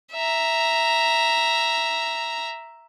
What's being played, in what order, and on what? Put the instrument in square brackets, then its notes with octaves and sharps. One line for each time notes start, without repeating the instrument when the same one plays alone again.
[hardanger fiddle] E5 A#5